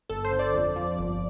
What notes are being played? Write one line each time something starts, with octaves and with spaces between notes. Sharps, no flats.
G1 A4
C5
D3
D5
F2
F3
G1